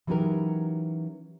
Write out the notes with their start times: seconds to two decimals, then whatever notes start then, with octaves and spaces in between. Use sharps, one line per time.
0.07 E3 F#3 C#4 D#4 G4 A#4